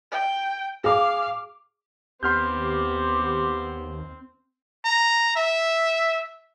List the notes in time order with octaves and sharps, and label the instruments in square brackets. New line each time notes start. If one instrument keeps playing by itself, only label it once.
[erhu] G5
[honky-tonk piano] G#4 D6 [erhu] F5
[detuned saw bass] D#2 [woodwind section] B3 G4 [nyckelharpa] C4 [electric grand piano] C6 F6 G6
[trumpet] A#5
E5